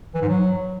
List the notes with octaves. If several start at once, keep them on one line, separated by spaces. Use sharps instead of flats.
E3
G#2
F#3